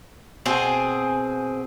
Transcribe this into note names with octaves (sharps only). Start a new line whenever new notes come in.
B2 C4 F#4 G#4 G#5